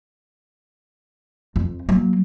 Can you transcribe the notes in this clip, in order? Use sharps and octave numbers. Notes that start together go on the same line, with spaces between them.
F2
F#3 A#3